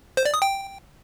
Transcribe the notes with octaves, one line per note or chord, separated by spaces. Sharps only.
C5
D5
D#6
G5